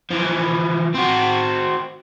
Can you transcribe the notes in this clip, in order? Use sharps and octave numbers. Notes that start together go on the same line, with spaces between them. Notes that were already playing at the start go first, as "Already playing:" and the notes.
E3 F3
C4 F#4